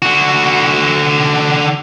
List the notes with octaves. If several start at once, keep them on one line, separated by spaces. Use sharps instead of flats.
D3 F#4